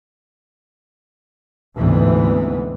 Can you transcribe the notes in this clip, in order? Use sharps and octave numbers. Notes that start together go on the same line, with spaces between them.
D2 G#2 C3 E3 B3